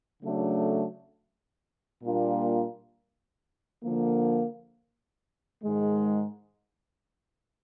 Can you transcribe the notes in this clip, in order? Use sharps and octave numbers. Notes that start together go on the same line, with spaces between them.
C#3 F#3 A3 D4
A#2 G3 A#3 D4 F4
D3 F3 A#3
G#2 D#3 G#3